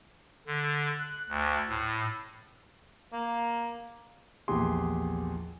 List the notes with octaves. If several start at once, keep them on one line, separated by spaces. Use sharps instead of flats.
D3
F#6
D2
A2
A#3
A#1 E2 A#2 G4 G#4 C6